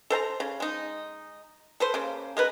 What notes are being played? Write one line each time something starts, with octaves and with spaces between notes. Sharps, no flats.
A4 C5 A5 A#5
C#3
G#3 D#4
A4 B4 C5
C#3 A#3
G#3 A#4 B4